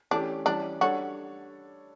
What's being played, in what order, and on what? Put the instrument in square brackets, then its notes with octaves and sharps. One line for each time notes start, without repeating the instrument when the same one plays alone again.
[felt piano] E3 A3 C#4 G4 [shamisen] D4
[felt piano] E3 G3 C#4 [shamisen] D4
[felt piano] G3 D4 A4 C#5 [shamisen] F#4